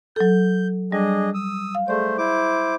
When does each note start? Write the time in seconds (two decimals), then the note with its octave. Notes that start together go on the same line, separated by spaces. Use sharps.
0.16 F#3 A4 G6
0.92 G3 D4 G#4 D#5
1.34 D#6 E6
1.75 F5
1.88 A3 G#4 C5 D5
2.18 E4 C5 D6